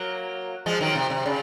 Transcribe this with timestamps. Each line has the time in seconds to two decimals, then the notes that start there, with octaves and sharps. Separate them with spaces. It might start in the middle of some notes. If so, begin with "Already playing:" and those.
Already playing: F#3 A#3
0.66 F3 G#3
0.81 D#3 F#3
0.95 C3
1.10 C3
1.26 C#3